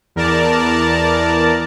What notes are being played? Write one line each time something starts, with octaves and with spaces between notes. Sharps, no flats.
E2 A#4 D5 A5